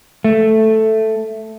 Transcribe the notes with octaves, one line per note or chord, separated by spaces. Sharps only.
A3